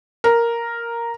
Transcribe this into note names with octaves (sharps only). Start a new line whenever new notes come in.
A#4